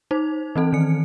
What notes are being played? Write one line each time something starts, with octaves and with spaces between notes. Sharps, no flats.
D#4 C5
E3 C4 A4
D#3 C#7